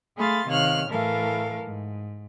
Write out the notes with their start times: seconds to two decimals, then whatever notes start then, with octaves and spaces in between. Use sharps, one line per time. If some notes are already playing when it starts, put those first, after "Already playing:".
0.17 A3 G#4 F5 B5 C6 A6
0.47 C3 D#3 C#5 F5 F6 F#6
0.90 A2 E3 A3 A4 A#4 F5
1.63 G#2